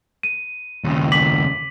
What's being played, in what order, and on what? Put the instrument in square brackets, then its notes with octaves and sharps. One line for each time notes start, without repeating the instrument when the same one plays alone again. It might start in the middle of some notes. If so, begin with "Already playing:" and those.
[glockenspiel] D#7
[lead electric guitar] D#2 C#3
[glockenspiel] D6 B6 F#7